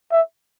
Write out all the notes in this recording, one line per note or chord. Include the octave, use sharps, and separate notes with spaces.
E5